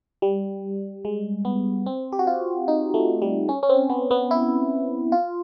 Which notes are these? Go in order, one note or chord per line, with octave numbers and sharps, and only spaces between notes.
G3
G#3
B3
C4
G4
F#4
F4
D#4
A3
G3
C#4
C#4
C4
B3
B3
E4
F4